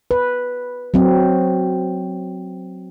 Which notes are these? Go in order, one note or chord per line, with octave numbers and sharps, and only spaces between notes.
B4
F#3 C4